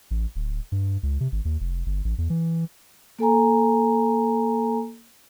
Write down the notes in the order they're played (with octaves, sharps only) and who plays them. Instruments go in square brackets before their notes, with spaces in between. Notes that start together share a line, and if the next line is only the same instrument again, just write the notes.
[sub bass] A1
D1
G2
C#2
C3
G#1
D#2
F1
G1
A1
E2
E3
[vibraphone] A#3 A4 G#5 A#5